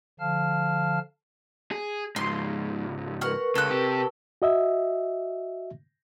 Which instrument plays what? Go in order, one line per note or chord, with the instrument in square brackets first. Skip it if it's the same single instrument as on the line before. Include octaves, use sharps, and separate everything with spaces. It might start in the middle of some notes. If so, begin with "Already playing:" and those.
[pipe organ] D3 F3 F5 A5 F6
[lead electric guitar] G#4
[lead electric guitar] C#2 G#2 [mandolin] C6
[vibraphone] A#4 B4 C#6 [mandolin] F#5 F6
[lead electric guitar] C#2 [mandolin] A4 F#6
[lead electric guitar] C3 G4
[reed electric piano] F#4 D#5 E5